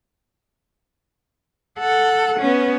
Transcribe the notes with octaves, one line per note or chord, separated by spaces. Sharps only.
A4 F#5
B3 C#4